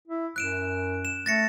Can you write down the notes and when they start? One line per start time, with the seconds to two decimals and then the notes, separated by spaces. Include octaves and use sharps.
0.08 E4
0.36 F#2 F#6 D7 E7
1.05 E7
1.26 A3 A6 A#6 C#7